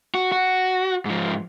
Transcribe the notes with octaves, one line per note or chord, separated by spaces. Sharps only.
F#4
F#4
G#2 F3